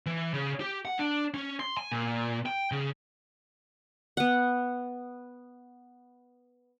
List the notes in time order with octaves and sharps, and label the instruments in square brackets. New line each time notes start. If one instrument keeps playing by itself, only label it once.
[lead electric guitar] E3
C#3
G4
F#5
D4
C#4
C6
G#5
A#2
G5
C#3
[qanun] B3 F#5